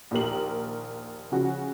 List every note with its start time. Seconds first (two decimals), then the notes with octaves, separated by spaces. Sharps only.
0.11 A#1 D#2 G4 A#4 F#7
1.32 C#3 F3 F#4